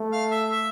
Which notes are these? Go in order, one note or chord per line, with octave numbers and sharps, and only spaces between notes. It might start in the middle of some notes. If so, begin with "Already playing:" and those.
Already playing: A3
F5
E5
E5